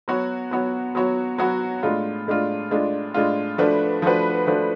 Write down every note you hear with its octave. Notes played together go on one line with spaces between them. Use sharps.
F#3 B3 F#4 C#5
F#3 B3 F#4 C#5
F#3 B3 F#4 C#5
F#3 B3 F#4 C#5
A2 G#3 D4 F4
A2 G#3 D4 F4
A2 G#3 D4 F4
A2 G#3 D4 F4
F3 A3 D4 F#4 B4
F3 A3 D4 F#4 B4
F3 A3 D4 F#4 B4